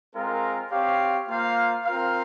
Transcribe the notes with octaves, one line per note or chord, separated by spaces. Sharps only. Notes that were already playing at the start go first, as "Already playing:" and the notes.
G#3 C4 F4 A#4
C4 G4 C#5 F5
A#3 F4 C5 F5
C4 F4 A#4 F5